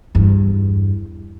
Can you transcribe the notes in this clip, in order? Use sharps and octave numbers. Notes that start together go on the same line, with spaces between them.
E2 G2